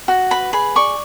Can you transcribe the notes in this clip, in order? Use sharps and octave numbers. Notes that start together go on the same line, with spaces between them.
F#4
B4 B5
G#4 B5
D5 C#6